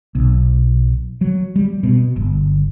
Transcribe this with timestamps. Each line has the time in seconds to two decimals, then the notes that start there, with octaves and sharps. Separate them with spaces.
0.15 B1
1.21 F#3
1.56 G3
1.83 B2
2.16 G1